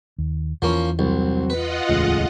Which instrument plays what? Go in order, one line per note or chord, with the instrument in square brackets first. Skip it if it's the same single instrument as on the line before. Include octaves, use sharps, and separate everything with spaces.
[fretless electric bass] D#2
[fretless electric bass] E2 E3 [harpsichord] F3 A#3 C#4
[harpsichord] C2 [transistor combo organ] F#3 C4
[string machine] F4 D#5 F#5 [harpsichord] B4
[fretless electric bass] D1 E2 [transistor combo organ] A2 C#3 G#3